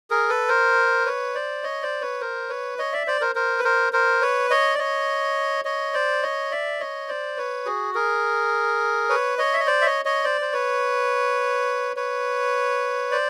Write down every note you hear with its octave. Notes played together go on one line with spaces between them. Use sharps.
G#4 A#4
A4 B4
A#4 C5
B4 C#5
C5 D5
C#5 D#5
C5 D5
B4 C#5
A#4 C5
B4 C#5
C#5 D#5
D5 E5
C5 D5
A#4 C5
A#4 C5
B4
A#4 C5
A#4 C5
B4 C#5
C#5 D#5
D5
C#5 D#5
C#5 D#5
C5 D5
C#5 D#5
D5 E5
C#5 D#5
C5 D5
B4 C#5
F#4 G#4
G#4 A#4
B4 C#5
C#5 D#5
E5
D#5
C5 D5
E5
C#5 D#5
C#5 D#5
C5 D5
C5
B4 C#5
B4 C#5
C5 D5